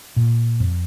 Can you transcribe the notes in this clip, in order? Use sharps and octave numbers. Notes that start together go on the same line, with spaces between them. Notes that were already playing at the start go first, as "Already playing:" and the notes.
A#2
F2